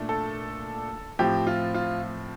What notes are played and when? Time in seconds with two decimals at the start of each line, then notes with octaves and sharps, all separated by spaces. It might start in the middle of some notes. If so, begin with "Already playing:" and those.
Already playing: A#2 A3 D4
0.09 A4
1.19 A2 F3 C4 G4
1.47 F4
1.74 F4